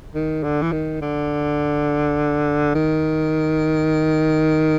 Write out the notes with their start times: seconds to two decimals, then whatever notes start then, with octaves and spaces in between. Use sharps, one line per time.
0.14 D#3
0.43 D3
0.62 E3
0.72 D#3
1.01 D3
2.75 D#3